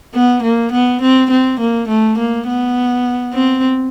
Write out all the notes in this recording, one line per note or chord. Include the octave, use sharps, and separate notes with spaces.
B3
A#3
B3
C4
C4
A#3
A3
A#3
B3
C4